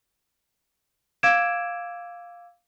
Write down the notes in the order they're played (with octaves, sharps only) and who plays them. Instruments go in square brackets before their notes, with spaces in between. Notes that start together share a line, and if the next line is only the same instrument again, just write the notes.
[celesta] F5 D6 E6 G#6 D7 E7